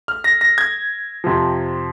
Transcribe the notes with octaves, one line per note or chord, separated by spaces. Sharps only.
F6
A#6
A#6
G#6
F2 C3 F3